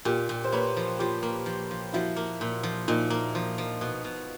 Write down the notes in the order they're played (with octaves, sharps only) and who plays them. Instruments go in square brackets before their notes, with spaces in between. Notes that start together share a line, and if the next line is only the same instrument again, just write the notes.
[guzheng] A#2 [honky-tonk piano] F4 G4
[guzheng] A#2
[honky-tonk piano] C5
[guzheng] A#3 [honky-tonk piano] B4 C#5
[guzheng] F3
[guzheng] F3 [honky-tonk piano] F4 G4
[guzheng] A#3
F3
F3
[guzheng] F3 [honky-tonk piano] E4 F#4
[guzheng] A#3
A#2
F3
[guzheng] A#2 [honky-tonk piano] D#4 F4
[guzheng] A#3
F3
F3
B2
B2